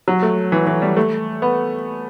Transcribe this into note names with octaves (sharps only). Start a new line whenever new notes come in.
F#3
A3
E3
E3
G3
A3
B3